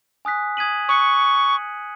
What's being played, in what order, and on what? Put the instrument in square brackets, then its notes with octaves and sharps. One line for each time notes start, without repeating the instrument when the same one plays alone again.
[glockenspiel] G#5 D#6 F#6 B6
D#6 G#6 B6 D#7 F#7
[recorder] C#6 [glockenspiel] D#6 F#6 C#7